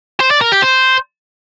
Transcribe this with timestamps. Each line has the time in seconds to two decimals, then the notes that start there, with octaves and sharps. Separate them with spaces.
0.20 C5
0.31 D5
0.41 A#4
0.52 G4
0.62 C5